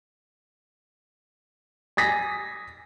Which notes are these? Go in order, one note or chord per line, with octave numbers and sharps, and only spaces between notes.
G#5 D#6 A#6 B6